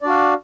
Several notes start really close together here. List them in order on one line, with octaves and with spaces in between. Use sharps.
D5 D4 F#4 F5